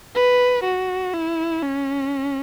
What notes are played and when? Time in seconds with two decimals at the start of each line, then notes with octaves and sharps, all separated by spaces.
0.15 B4
0.64 F#4
1.14 E4
1.63 C#4